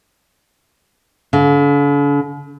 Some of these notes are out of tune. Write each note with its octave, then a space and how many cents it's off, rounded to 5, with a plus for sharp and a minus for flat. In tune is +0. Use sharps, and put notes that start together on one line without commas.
D3 -45